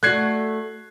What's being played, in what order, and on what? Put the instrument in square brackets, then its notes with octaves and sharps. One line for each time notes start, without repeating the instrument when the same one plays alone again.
[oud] A3 D4 F#4 [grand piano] F#6 G#6 C7